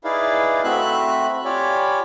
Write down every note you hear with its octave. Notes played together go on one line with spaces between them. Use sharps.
D#4 E4 G#4 B4 D5 F5
A3 C4 F#4 E5 B5 F#6
F4 G4 C#5 D5 G#5 B5